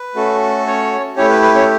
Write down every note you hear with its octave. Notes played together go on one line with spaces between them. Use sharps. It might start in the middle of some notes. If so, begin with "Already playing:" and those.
Already playing: B4
A3 C#4 F#4 A4
C#4 C#5
A3 C#4 E4 G4 C#5
B4
B4
C#4 C#5